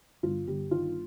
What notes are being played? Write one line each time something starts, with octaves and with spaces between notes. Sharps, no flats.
G1 F4
G1 G4
D#3 F4